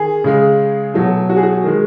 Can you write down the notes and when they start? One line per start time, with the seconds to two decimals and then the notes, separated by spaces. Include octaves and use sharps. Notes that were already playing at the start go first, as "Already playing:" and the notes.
Already playing: D#3 G#4
0.24 C#3 G#3
0.94 B2 F#3 A3
1.29 F#4
1.36 G#4
1.43 F#4
1.64 D#3 G#3